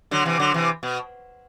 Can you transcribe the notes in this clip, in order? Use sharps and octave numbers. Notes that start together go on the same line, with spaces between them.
D3 F#3
C3 E3
D3 F#3
C3 E3
B2